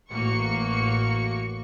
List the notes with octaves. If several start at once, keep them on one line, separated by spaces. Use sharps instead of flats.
A1 A#3 F#4 C#6 C#7